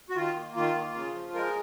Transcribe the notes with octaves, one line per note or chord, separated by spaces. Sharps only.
F#4
D#3 F4
A#3
D#3 F4
A#3
C#3
F3
G#3 A#4